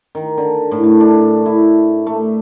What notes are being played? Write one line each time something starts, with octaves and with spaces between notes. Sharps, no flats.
D#3
D3
A2
A3
D4
E4
A3